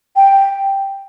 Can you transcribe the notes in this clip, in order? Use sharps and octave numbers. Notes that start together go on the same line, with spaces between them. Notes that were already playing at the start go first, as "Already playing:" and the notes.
G5